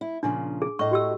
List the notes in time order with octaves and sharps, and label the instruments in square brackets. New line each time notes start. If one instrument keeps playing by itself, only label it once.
[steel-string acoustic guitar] E4
[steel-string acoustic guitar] A#2 C#3 F3 [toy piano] D4
[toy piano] G#4
[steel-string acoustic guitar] A2 D#5 [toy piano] C#6
[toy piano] F#4 G4 E6